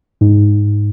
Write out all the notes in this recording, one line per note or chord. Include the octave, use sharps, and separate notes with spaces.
G#2